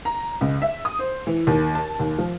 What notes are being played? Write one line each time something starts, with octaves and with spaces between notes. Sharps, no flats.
A#5
C#2
E5
D#6
C5
E3
D#2
A5
D#2
F3